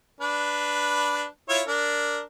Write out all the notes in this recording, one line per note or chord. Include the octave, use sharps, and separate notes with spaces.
D4 B4
E4 F4 C#5
D4 A#4